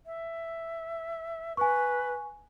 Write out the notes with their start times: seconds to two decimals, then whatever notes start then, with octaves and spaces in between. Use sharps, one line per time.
0.06 E5
1.57 B4 G#5 C#6